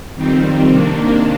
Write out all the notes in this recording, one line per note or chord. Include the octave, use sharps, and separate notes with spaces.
F2 D#3 G3 C4
C3 D#3 A#3 D4